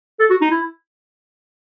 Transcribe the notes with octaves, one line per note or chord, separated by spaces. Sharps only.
A4
F#4
D#4
E4